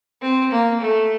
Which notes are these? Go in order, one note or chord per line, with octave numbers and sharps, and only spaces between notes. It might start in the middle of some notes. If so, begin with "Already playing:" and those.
C4
A#3
A3